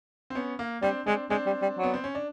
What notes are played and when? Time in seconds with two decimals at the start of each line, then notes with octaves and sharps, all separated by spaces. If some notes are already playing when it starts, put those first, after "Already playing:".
0.30 C4
0.35 B3 C#4
0.59 A#3
0.82 G3 C4 D4
1.07 G#3 C4 D4
1.30 G#3 C4 D4
1.47 G3
1.62 G3
1.78 F#3
1.83 B3
1.94 C4
2.04 C#4
2.15 D4